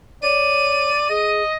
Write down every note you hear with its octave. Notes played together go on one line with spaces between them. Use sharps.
C#5 D5 D#7
G#4 D#5